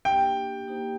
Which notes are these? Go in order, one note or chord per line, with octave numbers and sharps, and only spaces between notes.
A#3 D4 G4 G5
A#3 D#4 G4 C5